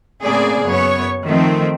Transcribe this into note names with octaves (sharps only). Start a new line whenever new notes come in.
A2 C#3 A#3 C4 G#4 D5
F#2 B3 C#5
D#3 F3 A3 C4